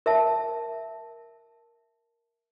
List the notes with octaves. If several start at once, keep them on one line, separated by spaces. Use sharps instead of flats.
A#4 E5 A5